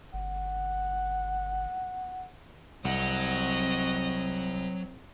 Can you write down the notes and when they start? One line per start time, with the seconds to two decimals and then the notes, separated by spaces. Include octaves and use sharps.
0.14 G1 F#5
2.85 C2 F#3 C4 D#5 F#5